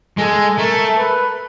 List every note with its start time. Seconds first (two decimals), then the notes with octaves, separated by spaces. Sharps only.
0.18 G#3 A4
0.58 A3 A#4
0.98 B4